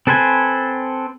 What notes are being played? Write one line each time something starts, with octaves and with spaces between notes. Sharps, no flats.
C4 A4 B4 C5 G#5